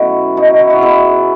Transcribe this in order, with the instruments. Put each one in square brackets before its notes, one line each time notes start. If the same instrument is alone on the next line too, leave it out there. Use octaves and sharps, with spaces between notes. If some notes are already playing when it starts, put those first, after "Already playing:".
Already playing: [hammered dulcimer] B2 F#3 A3 C#4 E4 F#4
B2 D#4 F#4
E4
F#4
B2 E4 G#4